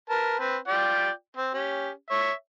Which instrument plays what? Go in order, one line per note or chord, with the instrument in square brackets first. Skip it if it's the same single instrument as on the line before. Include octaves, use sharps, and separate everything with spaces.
[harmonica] A#4 B4 A5
C4 B4
F4 D5 G5
C4
C#4 G4
C#5 E5